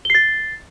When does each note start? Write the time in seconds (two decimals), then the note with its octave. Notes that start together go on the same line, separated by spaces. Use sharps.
0.05 G7
0.10 C7
0.15 A6